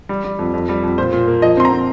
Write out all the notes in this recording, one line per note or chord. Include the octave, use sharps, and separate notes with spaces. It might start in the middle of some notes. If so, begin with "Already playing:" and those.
G3
G3
F2
F2
G3
F2
A#2 C5
A#2
A#3
F3 D#5
C4 C6
A#5
C4